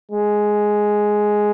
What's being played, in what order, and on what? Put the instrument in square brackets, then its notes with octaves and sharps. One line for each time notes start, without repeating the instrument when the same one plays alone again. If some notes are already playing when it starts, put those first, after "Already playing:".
[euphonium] G#3